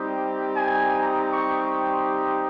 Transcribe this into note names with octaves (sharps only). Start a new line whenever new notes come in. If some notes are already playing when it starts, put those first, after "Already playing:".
Already playing: G3 C4 D#4 G4
G#5
A#5
C#6
C#6
C6